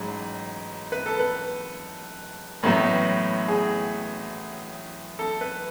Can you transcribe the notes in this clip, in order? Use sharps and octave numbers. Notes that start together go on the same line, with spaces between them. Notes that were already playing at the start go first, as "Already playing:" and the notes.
Already playing: A1 G#2 F#3
B4
A4
B4
A1 A2 F#3 B3
G#4
A4
B4